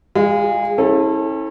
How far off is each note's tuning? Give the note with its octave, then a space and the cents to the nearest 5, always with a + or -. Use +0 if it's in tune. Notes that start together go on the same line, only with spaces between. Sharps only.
G#3 -30 F4 +0 G#4 +0
C#4 -40 E4 -35 A4 +0